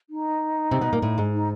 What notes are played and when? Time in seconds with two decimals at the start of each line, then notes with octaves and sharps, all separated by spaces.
0.10 D#4
0.71 C3 C4
0.81 B2 B3
0.93 A#2 A#3
1.02 A2 A3
1.18 G#2 G#3
1.34 D#4